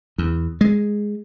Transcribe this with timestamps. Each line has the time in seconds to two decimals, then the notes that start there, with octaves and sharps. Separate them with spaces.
0.18 E2
0.61 G#3